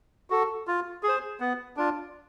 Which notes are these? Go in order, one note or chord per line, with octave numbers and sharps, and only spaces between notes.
F#4 A4
F4
G#4
C5
B3
D4 F4